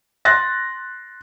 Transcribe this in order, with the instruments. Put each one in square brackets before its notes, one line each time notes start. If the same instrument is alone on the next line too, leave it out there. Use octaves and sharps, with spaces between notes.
[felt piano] C6 F#6 A6 A#6